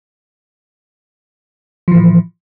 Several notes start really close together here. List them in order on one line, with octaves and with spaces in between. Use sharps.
F3 E3 A2